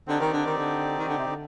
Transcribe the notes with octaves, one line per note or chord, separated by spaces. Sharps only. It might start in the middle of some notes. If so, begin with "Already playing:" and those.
D3 C4 D#4 G4 D5
D#3
D3
D#3
D3
D#3
D3
C3
D3